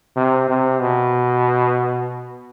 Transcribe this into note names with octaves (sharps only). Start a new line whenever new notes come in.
C3
C3
B2